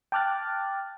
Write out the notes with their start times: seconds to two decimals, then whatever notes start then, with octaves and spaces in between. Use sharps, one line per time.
0.12 G5 A5 D6 F6 F#6 A6